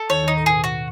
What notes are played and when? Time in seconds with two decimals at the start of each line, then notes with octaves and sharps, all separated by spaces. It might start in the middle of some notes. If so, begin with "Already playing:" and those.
Already playing: A4
0.10 D#2 D#3 C#5
0.23 D#2 D#3 D#4
0.37 A2
0.46 B2 G#4
0.64 F#4